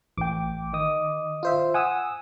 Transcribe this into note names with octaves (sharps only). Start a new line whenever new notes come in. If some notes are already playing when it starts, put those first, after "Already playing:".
A1 G5 D6
D#3 D#5 D#6
F4 C5 E5
F#5 G#5 D#6 E6